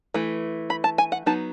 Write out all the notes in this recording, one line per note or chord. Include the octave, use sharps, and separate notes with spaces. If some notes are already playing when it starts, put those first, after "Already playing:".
E3 A3
B5
A5
G#5
F#5
F#3 B3 D#4 A5